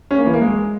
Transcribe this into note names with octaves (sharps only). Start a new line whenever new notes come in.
C#4
A#3
E3
A#3
G#3